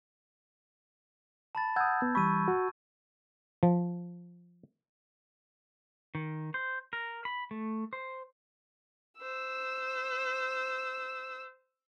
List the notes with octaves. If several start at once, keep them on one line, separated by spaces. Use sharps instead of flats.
A5 B5 A6
F#5 D#6 E6 G6 G#6
B3
E3 G3 B5 C#6 E6 D#7
F#4
F3
D#3
C5
A#4
B5
A3
C5
C5 E6